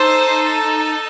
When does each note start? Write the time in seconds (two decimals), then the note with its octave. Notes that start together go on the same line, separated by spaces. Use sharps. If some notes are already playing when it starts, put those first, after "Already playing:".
Already playing: D#4 A4 C5